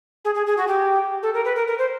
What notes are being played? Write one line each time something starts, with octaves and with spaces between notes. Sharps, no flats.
G#4
G#4
G#4
F#4
G4
A4
A#4
B4
A#4
A#4
C5